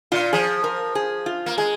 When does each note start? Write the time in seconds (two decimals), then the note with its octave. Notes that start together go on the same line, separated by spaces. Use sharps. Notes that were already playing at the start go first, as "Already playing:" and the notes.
0.12 A#2 F4
0.33 F3 G#4
0.64 A#4
0.95 G#4
1.26 F4
1.46 A#3
1.58 G#3 G#4